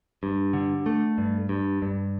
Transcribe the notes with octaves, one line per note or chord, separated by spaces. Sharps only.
G2
D3
A3
G2
G2
G2